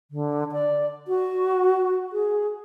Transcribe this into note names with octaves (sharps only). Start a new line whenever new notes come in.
D3
D5
F#4
G#4